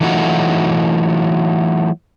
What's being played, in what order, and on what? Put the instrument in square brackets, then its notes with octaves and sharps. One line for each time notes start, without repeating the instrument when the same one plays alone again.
[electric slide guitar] E3 F#3 A3 D#4 F4 F#4